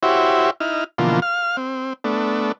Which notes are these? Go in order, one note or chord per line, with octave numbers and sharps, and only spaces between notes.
E4 F#4 G4 C5 C#5 E5
D#4 E4 F6
B2 D3 E3 F3 A#3 F4
F5 F6
C4
A3 B3 D4